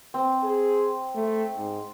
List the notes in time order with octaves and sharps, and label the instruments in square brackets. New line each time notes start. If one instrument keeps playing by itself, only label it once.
[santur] C4
[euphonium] G#4
A3
G#2